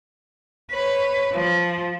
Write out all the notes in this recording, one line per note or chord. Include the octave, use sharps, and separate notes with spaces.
B4 C#5
F3